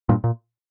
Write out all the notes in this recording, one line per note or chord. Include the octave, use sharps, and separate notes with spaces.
G2 A#2
A#2